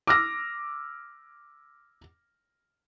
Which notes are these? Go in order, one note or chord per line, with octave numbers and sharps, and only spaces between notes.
D6 E6 F6 A#6